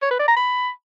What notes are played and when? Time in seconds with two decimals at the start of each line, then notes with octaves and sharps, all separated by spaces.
0.02 C#5
0.11 B4
0.19 D5
0.28 A#5
0.36 B5